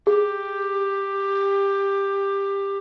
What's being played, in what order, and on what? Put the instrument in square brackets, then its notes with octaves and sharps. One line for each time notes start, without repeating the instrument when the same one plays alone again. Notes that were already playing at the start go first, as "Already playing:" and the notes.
[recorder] G4 [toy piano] G#4